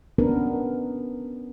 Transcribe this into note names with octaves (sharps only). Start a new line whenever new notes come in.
B3 C#4 D4 A#4 B4